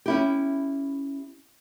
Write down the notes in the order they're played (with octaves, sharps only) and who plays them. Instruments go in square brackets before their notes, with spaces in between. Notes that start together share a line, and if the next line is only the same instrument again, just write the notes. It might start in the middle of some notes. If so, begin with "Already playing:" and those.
[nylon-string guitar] C#4 E4 G4